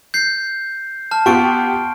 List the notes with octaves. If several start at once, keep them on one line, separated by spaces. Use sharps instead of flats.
G6 C7
A5 F6
B3 F4 G4 C6 C#6 D7